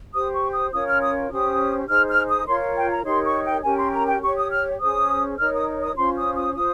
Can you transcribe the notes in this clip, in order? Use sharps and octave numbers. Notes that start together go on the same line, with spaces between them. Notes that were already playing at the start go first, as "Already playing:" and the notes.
G4 C5 D#6
C#6
D#6
C#4 F4 A#4 C#5 D#6
F6
D#6
C#4 G4 C5 D#6
D#4 G#4 C5 F6
F6
D#6
F4 A#4 C#5 C6
G5
A#5
D#4 G4 A#4 C#5 C6
C#6
G5
C#4 G4 A#4 G#5
C6
A#5
G5
G4 C#5 C#6
D#6
F6
C#4 G#4 C5 D#6
D#4 A#4 C#5 F6
D#6
D#6
C#4 F4 C5 C6
D#6
D#6
F4 C5 D#6